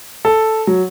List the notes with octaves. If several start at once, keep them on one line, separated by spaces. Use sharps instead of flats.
A4
F#3